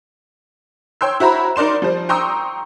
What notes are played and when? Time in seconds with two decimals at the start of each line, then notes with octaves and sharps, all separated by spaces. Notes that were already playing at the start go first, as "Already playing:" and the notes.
1.01 C#5 G5 C6 E6
1.20 E4 F#4 C5 A#5 B5
1.56 D#4 A#4 D5 C6 E7
1.82 F3 G3 C5
2.09 G5 A#5 C6 C#6 D#6 E6